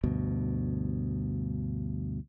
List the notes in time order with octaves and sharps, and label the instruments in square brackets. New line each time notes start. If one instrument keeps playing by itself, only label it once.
[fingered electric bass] D2 G2 B2